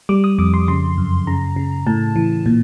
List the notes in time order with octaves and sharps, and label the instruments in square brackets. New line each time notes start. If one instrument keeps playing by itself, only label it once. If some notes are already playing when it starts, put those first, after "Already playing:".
[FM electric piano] G3 D6
D#6
F2 D6
C6
C#3 C6
F#2
C#3 A#5
C#3
A2 A5
E3
A#2